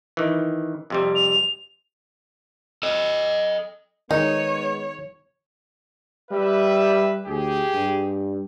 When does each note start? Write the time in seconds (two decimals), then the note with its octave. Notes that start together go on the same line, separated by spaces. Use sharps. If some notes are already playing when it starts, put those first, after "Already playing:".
0.17 D#3 E3
0.90 F2 C3 G3
1.15 F7
2.83 A4 D#5
4.11 D#3 G#3 B3 D#4 C#5
6.31 G3 B4 E5
7.26 D2 G4 G#4
7.74 G2